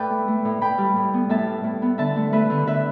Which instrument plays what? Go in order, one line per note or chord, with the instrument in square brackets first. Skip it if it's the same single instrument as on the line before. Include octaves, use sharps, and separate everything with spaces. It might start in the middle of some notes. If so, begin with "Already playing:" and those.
Already playing: [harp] A2 A4 B4 D5 E5 G5
A3
A3
A2
A2 G5 B5
G3
A2
B3
A2 E5 A5
G3
A2
B3
D3 E5 A5
A3
A3 B4 E5
D3
D3 B4 E5